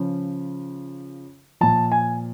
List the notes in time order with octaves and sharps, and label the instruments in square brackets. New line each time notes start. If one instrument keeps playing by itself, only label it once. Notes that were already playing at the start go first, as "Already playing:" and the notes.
Already playing: [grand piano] C#3 F3
A#2 F3 A5
G#5